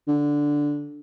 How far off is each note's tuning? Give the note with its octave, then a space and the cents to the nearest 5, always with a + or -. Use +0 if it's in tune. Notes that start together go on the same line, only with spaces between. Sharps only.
D3 -5